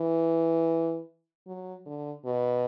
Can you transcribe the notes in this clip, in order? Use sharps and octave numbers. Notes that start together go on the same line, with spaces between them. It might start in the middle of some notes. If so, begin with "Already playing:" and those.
Already playing: E3
F#3
D3
B2